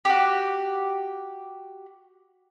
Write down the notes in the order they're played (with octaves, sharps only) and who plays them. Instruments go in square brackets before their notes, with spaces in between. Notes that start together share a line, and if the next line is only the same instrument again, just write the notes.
[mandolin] F#4 G4